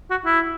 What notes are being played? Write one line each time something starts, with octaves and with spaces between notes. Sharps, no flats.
F#4
E4